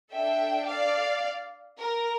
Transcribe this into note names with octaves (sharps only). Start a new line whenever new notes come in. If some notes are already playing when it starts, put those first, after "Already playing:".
D4 A4 E5 G5
D5 F5
A#4